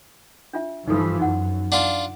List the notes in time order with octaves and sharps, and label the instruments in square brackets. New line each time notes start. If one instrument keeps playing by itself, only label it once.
[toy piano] D4 F4 E5
[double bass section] G2 E3 F3 [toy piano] D#4 A4
[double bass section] F#2 [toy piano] D#4 F#4 F#5
[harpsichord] D4 F4 [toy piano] F#5